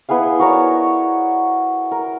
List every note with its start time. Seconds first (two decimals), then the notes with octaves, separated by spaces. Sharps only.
0.09 B3 E4 G#4 F5
0.39 F#4 A#4 C#5 D5
1.91 A#4